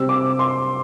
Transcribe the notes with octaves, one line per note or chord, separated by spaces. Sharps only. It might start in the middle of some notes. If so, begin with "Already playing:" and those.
Already playing: C3 G3 C4 E6
D6
C6